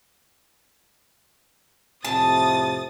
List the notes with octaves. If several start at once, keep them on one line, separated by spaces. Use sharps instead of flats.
F2 A2 C3 A5 D#6 A6